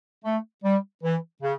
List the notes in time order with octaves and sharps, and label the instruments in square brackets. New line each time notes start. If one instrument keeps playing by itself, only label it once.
[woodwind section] A3
G3
E3
C#3